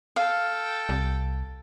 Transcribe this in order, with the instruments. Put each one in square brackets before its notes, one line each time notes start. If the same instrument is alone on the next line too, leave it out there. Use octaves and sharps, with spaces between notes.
[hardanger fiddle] A4 G5 [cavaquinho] F5
[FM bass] C2